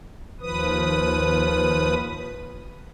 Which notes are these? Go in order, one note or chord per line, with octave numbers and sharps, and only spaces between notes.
D#2 F3 B4 D#6